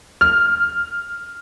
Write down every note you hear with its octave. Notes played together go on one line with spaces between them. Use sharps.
F6